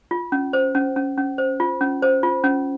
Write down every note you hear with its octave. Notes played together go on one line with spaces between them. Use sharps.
F4
C#4
C5
C#4
C#4
C#4
C5
F4
C#4
C5
F4
C#4